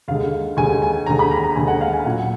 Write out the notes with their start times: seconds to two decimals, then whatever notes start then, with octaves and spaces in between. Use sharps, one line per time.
0.08 D#2 D3 G#3 F5
0.57 D#2 D3 G#3 G#5
0.82 G#5
1.06 D#2 D3 G#3 A#5
1.19 B5
1.31 A#5
1.44 A#5
1.55 D#2 D3 G#3 G#5
1.68 F#5
1.81 F5
1.93 G#5
2.05 A#2 F#3 F#5